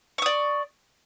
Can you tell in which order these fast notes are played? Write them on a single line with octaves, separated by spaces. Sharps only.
C#6 D#6 D5